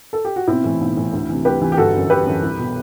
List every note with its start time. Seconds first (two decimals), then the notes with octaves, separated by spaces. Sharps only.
0.13 A4
0.25 G4
0.36 F#4
0.47 B1 C4 E4
0.64 A2 E3
0.81 B1
0.97 A2 E3
1.13 D2
1.29 C3 E3
1.45 D2 G4 B4
1.61 C3 E3
1.72 G4
1.77 G1 F#4 A4
1.94 F#2 E3
2.10 G1 G4 B4
2.26 F#2 E3
2.43 C2
2.59 B2